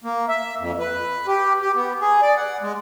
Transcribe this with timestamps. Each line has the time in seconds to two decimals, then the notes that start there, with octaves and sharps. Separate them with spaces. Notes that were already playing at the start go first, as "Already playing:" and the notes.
0.04 A#3
0.29 E5
0.60 F2
0.80 B4
1.27 G4
1.62 G4
1.75 B3
2.01 G#4
2.22 D5
2.37 F#5
2.62 G#3